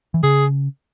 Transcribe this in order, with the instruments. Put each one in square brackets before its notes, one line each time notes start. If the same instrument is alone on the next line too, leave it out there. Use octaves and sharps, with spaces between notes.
[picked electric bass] E3
[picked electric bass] C#3 [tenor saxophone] G#4